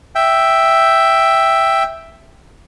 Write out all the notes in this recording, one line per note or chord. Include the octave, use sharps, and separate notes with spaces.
E5 G5